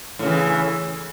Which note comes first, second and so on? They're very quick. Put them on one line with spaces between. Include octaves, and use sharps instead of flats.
A2 C#3 E3